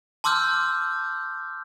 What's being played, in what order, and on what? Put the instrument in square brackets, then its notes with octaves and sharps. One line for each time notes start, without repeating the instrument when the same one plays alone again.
[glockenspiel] A5 C6 D6 E6 F6 G6